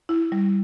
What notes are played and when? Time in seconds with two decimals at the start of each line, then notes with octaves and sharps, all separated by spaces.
0.09 E4
0.32 G3